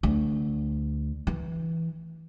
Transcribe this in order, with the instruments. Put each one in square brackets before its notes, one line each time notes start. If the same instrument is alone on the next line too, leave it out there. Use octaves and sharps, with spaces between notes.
[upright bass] D2
E3